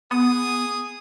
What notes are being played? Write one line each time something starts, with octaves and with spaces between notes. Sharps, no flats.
B3 G#4 D#6